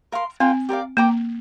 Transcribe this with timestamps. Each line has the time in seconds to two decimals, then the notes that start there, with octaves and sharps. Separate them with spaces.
0.12 A#4 F5 C6
0.40 C4 F4 A#4 G5
0.69 G4 A#4 D5 F5
0.97 A#3 A#4 G5 A#5 D6